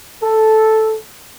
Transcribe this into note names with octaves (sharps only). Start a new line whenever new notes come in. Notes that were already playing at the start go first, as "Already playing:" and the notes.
A4